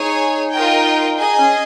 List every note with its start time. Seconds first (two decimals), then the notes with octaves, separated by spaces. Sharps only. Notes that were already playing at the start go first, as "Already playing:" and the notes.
Already playing: D#4 G#4 C#5 G#5
0.51 F4 A#4 D#5 G5
1.16 D#4 G#4 D#5 G#5
1.38 C#4